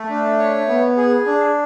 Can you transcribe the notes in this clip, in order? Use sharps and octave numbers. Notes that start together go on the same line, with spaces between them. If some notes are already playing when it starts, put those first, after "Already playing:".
Already playing: A3
D4
C#5
B3
G#4
D4